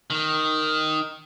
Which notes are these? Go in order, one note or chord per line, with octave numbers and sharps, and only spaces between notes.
D#3